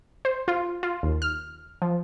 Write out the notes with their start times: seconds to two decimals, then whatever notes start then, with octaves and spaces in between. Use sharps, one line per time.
0.25 C5
0.48 F4
0.83 F4
1.03 D#2
1.22 F6
1.82 F3